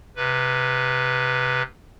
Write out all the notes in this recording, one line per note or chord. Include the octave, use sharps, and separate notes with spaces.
C3 B4